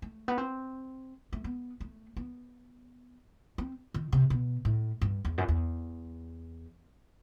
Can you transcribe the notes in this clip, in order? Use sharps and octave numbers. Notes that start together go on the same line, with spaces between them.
A3
B3
C4
A3
B3
A3
B3
C4
D#3
C3
B2
A2
G2
E2
F#2
E2